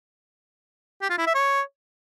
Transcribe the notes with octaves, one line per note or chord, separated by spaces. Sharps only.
G4
F4
E4
E5
C#5